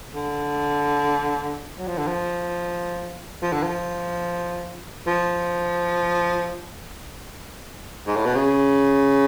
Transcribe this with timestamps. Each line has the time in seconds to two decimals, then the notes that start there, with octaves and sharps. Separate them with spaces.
0.14 D3
1.78 F#3
1.88 F3
1.98 D3
2.07 F3
3.42 F3
3.53 D3
3.63 F3
5.07 F3
8.07 G#2
8.16 A2
8.25 B2
8.35 C#3